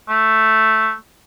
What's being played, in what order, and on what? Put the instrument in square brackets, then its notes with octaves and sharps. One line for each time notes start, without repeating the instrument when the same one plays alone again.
[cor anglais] A3